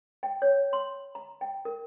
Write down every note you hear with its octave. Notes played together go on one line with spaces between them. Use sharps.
G5
C#5
C6
A#5
G5
A#4